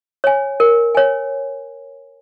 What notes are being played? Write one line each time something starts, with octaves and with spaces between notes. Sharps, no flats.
C#5 G#5
A#4
C#5 G#5